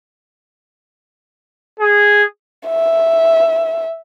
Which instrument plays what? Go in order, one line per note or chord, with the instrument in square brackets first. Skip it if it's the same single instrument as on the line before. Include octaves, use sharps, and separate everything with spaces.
[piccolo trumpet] G#4
[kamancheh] E5